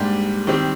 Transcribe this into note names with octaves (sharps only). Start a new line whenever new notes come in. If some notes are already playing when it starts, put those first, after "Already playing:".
Already playing: G#2 G3 A#3 D4 G4
D#3 G3 C4 G4